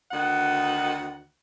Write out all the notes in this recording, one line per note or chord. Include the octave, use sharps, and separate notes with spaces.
D2 D#3 F#5